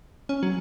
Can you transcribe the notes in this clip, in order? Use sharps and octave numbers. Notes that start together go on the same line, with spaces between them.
C#4
F#3